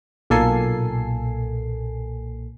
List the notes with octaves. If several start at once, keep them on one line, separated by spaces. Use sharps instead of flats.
B1 A#2 A#3 A4 G#5 C7